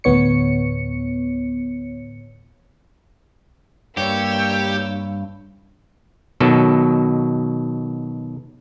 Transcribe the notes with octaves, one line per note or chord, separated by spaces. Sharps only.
D2 A2 B3 C#5 C#7
G2 A#3 G4 C#5 E6
B2 D#3 F#3 A4